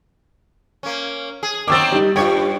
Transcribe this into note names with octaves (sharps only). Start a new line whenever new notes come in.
A#3 C#4
G#4
D#3 F#3 C4 D6 E6 A6
G3 D#4
G2 F4 G4 C#5 G5